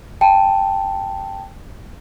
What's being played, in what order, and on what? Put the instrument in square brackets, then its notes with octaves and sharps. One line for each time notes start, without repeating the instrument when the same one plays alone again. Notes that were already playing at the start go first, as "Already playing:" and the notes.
[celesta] G5 A5